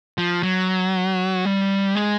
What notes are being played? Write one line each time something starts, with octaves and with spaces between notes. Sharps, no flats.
F3
F#3
G3
G#3